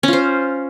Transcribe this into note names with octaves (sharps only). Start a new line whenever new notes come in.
C#4 F4 C5